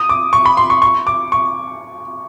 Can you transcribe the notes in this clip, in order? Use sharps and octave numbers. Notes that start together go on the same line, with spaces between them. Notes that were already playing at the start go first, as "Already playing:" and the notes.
Already playing: D#6
D6
C#6
B5
C6
C#6
C#6
D6
C#6